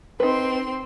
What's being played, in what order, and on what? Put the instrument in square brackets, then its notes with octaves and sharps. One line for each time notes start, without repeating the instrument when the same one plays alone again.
[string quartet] C4 C6 [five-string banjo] D#4 B4